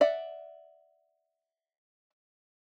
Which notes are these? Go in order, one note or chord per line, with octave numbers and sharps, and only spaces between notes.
D5 E5 F#5